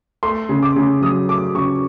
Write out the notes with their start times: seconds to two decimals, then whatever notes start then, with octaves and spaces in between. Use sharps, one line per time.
0.23 A3 C6
0.49 C#3
0.63 D6
0.76 C#3
1.01 F#3 D#6
1.29 A3 D6
1.55 C#3 C#6